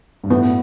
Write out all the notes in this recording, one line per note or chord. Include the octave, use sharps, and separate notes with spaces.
G2
A2 B3